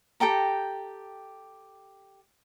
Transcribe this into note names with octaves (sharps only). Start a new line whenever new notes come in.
G4 A4 G5 A#5